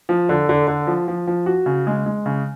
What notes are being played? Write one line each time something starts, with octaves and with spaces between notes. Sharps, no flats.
F3
D3
D3
D3
F3
F3
F3
F#4
C#3
G#3
G#3
C#3